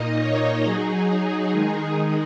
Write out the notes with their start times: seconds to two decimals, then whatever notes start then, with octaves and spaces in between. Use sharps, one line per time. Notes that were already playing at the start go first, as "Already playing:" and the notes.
Already playing: A#2 A#3 D#4 D#5
0.19 C#5
0.63 F#3 D#4 G#4
1.51 D#3 G#3 D#4
1.94 G#4